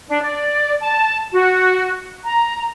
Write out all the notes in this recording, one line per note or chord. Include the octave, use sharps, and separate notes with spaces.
D4
D5
A5
F#4
A#5